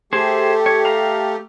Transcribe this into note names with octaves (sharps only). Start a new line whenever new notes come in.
A3 G4 G#4 C5
C#5
F5 A#5